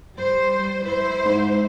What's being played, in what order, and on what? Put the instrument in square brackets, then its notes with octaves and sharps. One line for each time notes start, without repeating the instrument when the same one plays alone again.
[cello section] G3 C5
E4 C5
[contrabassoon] G#2